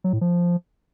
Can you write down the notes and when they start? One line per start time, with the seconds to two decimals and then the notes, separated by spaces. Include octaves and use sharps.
0.04 F#3
0.13 A2
0.21 F3